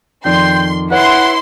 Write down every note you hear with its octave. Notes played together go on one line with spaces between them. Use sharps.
F2 D#3 D5 G5 C6
E4 B4 C#5 F#5 C6